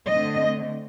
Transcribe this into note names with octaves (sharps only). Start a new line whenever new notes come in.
D3 A3 C4 D#5